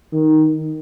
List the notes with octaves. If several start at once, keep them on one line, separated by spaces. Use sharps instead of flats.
D#3